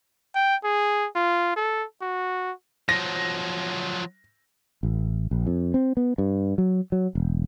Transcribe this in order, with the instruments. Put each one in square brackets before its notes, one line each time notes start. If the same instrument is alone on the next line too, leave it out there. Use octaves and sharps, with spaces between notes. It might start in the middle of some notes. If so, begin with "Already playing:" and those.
[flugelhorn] G5
G#4
F4
A4
F#4
[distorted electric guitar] F3 F#3 [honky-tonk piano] A#6
[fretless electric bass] A1
A#1
F2
C4
B3
G2
F#3
F#3
E1